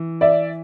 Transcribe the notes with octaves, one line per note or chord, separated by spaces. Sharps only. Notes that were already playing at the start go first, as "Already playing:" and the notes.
Already playing: E3
D5 E5